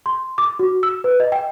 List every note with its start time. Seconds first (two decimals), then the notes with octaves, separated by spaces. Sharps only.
0.06 C6
0.38 D6
0.59 F#4
0.83 E6
1.04 B4
1.20 D#5
1.32 G5